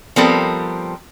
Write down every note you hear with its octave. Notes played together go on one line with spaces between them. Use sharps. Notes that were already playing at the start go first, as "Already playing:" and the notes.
F3 G3 B3 C4 A4 A#4